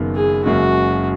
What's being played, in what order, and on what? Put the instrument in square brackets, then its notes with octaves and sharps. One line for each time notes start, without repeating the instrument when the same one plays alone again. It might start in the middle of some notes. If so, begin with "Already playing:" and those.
Already playing: [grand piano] F#1 F#2 D#3 B3
[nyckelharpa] G#4
[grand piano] F#1 F#2 C#3 G#3 [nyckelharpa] F#4